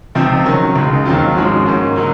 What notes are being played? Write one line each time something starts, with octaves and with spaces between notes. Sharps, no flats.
C#2 C3 F3 C4 D#4
D#3 F#3 C#4
C#2 C#3 G#3
D#2 D#3 F#3 C4 F4
G#2 F3 G#3 C#4 F#4
G#2 D#3 A#3 C#4
C#3 F#3 A#3 D#4